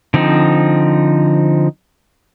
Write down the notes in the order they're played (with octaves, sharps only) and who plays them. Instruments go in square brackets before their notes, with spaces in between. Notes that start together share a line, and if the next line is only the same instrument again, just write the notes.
[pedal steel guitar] D3 F3 C4 D#4